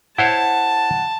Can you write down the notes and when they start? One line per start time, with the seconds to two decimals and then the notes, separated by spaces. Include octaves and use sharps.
0.18 E4 C5 C#5 F#5 A5